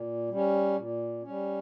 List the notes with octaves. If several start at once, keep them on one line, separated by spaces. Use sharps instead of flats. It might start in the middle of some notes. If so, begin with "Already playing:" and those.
Already playing: A#2
G3 C#4
A#2
C#4
G3